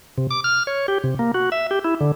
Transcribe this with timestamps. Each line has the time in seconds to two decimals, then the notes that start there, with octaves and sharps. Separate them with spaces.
0.18 C3
0.31 D6
0.44 F6
0.67 C#5
0.88 G4
1.04 C3
1.19 A#3
1.34 F#4
1.52 E5
1.71 G4
1.84 E4
2.01 D3